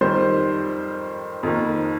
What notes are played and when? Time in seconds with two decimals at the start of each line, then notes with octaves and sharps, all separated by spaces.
0.01 F2 D#3 G3 C5
1.43 F2 D#3 A#3